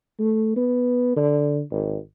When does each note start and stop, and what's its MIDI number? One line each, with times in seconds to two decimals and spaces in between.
0.19 0.52 57
0.56 1.12 59
1.16 1.62 50
1.71 1.97 32